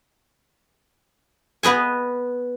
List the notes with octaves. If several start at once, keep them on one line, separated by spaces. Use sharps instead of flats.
B3 B4 D#5 G#5